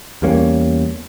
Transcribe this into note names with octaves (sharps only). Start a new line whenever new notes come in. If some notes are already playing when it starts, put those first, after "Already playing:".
E2 G3 A#3 C#4